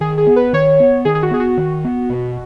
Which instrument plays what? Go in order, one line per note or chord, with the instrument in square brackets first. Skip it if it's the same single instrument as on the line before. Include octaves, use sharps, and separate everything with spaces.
[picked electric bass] D#3 [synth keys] G#4
[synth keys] G#4
[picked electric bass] B3
[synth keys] B4
[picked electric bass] D#3 [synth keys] C#5
[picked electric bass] B3
[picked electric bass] D#3 [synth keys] G#4
[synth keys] G#4
F#4
[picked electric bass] B3 [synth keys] G#4
[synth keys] F#4
[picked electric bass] D#3
B3
B2